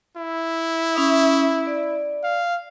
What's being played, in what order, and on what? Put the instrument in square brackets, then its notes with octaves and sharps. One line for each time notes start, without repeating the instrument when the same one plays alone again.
[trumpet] E4
[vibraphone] C#4 E5 D#6
D5
[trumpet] F5